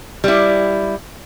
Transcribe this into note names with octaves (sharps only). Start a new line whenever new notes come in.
G3 E4